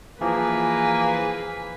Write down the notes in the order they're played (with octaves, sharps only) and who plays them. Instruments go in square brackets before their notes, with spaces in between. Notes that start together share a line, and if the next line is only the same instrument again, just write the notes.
[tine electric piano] E3 F3 [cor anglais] A#3 [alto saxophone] G#4 [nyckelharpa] B4